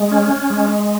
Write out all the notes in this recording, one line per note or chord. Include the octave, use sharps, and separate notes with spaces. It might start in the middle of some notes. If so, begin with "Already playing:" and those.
Already playing: G#3
C#4
G#3